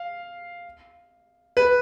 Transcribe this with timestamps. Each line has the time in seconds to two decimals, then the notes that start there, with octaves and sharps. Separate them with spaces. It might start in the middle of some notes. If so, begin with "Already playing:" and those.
Already playing: F5
1.57 B4